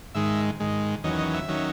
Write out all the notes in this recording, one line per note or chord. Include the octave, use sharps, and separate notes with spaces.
G#2 D#3 G#3 E5
G#2 D#3 G#3
E2 D#3 F#3 C#4 D#5
D#5
E5
D#3 F#3 C#4